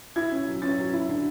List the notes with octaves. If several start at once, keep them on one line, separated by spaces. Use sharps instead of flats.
E4 G#6
C#4
F#3
C#4 A6
F#3
E4
D3